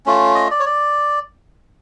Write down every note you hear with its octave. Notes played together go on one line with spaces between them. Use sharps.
A3 C#4 F4
D#5
D5
C#5
D5